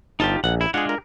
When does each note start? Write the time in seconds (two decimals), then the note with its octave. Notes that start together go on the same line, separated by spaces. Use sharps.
0.20 G1 D#4 F4 G4 A5
0.44 A#1 F#5
0.61 E4
0.74 G#3 D4 F4 G#4 F#5
0.89 A#4